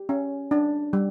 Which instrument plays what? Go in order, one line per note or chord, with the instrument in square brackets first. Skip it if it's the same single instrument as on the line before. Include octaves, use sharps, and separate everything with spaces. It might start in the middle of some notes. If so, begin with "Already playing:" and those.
Already playing: [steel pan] G4
C#4
D4
G3